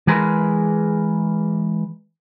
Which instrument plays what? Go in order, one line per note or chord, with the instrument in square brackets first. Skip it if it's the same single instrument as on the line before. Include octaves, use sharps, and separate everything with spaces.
[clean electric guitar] E3 G#3 G#4 A#4 B4 C6